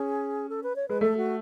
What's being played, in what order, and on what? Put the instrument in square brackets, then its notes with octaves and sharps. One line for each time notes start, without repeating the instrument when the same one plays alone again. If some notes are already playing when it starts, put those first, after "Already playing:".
Already playing: [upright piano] C#4 [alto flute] G#4
[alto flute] A4
B4
C#5
[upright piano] G#3 [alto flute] B4
[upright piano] A3 [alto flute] A4
[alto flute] F#4